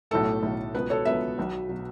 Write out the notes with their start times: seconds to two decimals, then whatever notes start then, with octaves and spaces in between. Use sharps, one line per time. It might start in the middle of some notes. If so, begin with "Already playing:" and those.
0.11 B1 A2 A3 A4
0.43 B1 A2 A3
0.74 C#2 B2 F#3 B3 B4
0.90 A4 C#5
1.05 C#2 B2 F#3 B3 B4 E5
1.38 B1 B2 F#3
1.69 B2 F#3